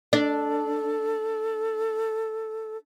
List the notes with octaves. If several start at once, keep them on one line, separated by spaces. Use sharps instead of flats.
D4 A4